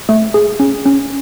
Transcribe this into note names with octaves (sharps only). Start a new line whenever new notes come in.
A3
G#4
C#4
C#4